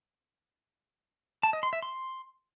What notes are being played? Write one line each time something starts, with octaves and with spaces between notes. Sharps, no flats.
A5
D#5
C6
E5
C6